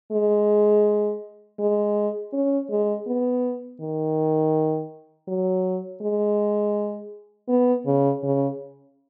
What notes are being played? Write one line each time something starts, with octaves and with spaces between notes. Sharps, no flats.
G#3
G#3
C#4
G#3
B3
D#3
F#3
G#3
B3
C#3
C#3